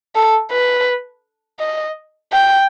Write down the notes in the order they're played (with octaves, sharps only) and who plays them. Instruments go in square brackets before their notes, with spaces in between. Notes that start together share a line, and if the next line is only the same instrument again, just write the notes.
[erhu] A4
B4
D#5
G5